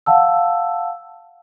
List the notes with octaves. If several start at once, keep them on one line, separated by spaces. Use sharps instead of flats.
F5 F#5 A5 E6